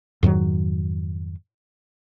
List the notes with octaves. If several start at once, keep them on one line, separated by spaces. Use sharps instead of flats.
F2 G#2 D#3 F#3